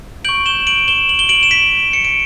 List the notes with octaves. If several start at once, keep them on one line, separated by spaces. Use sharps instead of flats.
C#6 G6 D7 F#7
E7 G7
D7 F#7
E7 G7
F#7
G7
D7 F#7
E7
B6 D7
C#7
D7